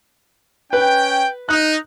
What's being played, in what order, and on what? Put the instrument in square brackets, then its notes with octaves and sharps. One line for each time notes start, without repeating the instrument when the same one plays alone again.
[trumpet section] C#4 G5 [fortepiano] B4
[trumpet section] D#4 [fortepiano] F#6